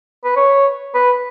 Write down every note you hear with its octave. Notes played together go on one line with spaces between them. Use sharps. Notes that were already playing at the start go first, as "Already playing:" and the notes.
B4
C#5
B4